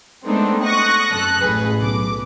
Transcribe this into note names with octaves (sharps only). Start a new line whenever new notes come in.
G#3 A3 B3 C4 D4 D#4
C#6 D#6 F#6 A#6
F#2 A4 F#6
A1 G#4 B4
B1 D6